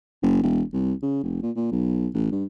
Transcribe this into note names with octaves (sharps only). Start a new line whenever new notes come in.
F#1
E1
C2
C#3
F1
A#2
A#2
B1
A1
G2